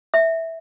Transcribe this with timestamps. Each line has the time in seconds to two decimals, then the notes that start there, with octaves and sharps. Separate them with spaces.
0.14 E5